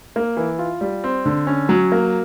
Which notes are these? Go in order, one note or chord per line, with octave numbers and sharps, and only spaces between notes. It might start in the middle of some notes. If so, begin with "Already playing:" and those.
A#3
E3
F4
G3
C4
D3
C#4
F#3
A#3